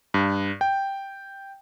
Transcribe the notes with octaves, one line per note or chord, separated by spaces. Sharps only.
G2
G5